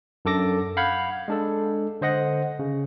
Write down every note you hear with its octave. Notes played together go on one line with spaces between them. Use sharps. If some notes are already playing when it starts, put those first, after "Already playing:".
F#2 D4 A4 D6 A#6
F5 F#5 B5 G6 G#6
G#3 D4 A4
D3 C5 D#5 F#5 A#6
C#3